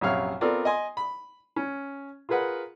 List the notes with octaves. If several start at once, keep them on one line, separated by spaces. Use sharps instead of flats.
A#1 F#2 C3 C#5 F5 F6
B3 C4 F4 A4 A#4 D5
D#5 G#5 C6
B5
C#4
F4 G#4 A#4 B4 F#5